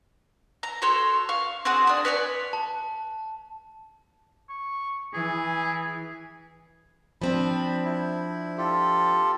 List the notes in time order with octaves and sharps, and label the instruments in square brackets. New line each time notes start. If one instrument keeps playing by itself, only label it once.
[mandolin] A#5
F#4 A4 C#5 C6
F5 C#6
C4 F#4 G#4
D4 D#6
B4 C#5 D5 G#5
[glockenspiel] A5
[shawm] C#6
[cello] E3 [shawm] G#4
[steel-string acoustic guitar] F3 C4 D4 [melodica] B5
[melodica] E4
F4 G4 A4